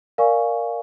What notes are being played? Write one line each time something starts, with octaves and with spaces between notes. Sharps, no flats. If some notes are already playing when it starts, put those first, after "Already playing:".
A#4 D5 F5 G#5 C#6